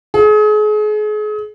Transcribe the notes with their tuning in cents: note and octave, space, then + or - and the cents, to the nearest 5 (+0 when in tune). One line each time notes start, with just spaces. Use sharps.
G#4 +35